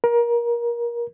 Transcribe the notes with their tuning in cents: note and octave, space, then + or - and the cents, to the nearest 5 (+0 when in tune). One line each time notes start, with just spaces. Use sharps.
A#4 +25